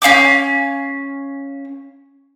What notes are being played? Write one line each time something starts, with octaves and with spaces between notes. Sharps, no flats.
C#4 F5 G#5 D6